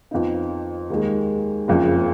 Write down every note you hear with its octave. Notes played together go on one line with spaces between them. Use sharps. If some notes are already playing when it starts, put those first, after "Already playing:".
F2 F3 B3 D#4
D#2 D#3 G#3
F#1 F2 C#3 F3